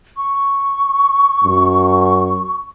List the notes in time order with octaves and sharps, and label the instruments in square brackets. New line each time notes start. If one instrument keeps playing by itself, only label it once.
[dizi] C#6
[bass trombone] F#2